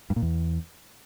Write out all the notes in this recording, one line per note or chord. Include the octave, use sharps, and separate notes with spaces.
G2
A#2
E2